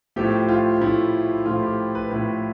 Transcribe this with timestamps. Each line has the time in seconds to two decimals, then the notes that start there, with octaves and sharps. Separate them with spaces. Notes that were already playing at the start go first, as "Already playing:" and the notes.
0.16 A2 F3 A3 G4
0.48 F4
0.81 A2 F3 A3 E4
1.46 A2 F3 A3 F4
1.62 G4
1.95 B4
2.11 A2 F3 A3 B4